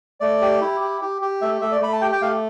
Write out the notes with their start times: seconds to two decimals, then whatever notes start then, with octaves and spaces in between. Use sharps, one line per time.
0.20 A3 D5
0.42 G4
0.61 E4
0.81 G4
1.01 G4
1.22 G4
1.42 A3 E5
1.61 A3 E5
1.72 D5
1.81 A3 B5
1.93 A5
2.01 G4 G5
2.12 G5
2.21 A3 F5